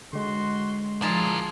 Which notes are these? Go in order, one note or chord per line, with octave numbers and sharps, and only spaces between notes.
D3 G#3 F#4 C6
F3 D4 E4 G#4 A#4 D5 A5